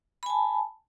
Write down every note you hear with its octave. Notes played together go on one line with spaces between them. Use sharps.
G#5 A5 B5